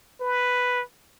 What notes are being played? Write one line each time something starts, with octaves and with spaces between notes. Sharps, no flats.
B4